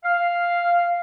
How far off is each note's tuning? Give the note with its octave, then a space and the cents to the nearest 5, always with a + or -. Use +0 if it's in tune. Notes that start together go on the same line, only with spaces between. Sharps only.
F5 -5